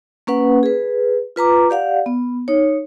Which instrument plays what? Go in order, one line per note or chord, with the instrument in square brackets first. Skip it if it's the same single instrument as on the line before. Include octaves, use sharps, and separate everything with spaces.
[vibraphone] A#3 C#4 B4 F#5
G#4 B4
F4 B4 A#5 D6
G4 D5 F5 F#5
B3
D#4 C#5